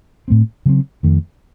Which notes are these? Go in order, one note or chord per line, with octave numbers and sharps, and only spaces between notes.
A2 A3 C4
C#3 F#3 C4
F2 D#3 A3